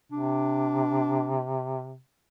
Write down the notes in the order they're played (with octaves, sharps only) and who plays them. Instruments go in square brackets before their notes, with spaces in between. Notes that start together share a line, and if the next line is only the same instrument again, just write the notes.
[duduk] C3 [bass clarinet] D4